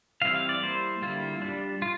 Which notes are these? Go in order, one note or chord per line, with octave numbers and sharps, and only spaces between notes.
E3 G3 C4 E4 F5
F5
D5
G3 A#3 E4 C5
D3 G3 A#3 E4 F4
G3 D4
F4